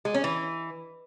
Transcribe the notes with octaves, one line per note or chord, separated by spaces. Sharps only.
G#3
C#4
E3